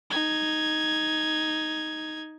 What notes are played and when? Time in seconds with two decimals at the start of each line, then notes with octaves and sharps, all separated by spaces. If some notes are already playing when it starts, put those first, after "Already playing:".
0.10 D#4 G#6